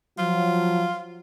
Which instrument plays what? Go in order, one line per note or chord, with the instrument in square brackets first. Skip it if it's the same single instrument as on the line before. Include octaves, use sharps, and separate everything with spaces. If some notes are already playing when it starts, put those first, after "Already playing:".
[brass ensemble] F3 F#3 [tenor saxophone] F4